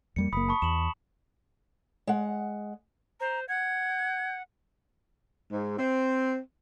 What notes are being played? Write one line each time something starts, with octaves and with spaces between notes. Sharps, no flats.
F2 G3 A#3 C#7
F#1 A#3 B5 D#6 B6
A5 B5 C#6
E2 E7 F#7
G#3 F#5
C5 A#5
F#5 G#6
G#2
C4